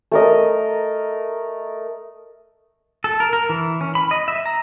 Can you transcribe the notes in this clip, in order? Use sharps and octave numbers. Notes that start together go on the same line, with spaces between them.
A3 A#4 D#5
A4
A#4
A#4
E3
C#4
B5
D#5
E5
A#5